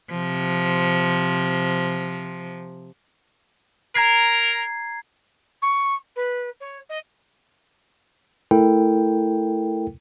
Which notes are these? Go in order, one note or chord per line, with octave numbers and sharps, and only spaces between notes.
C3 F3
A#4 A#5 G#6 C7
C#6
B4
C#5
D#5
A3 E4 A4 A#4 G5